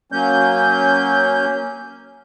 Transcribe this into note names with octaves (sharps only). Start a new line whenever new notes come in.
F#3 A#3 C#4 G6